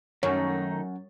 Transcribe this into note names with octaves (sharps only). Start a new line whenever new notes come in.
F#2 D#3 A3 D#4 C#5